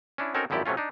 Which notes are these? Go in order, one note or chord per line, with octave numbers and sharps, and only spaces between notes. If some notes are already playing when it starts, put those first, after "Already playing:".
C#4 D4 E4
C4 C#4 D#4 F#4 A4 A#4
G#1 F#2 F3 E4 G4 D5
C3 F#3 A3 C#4 F4
D4 D#4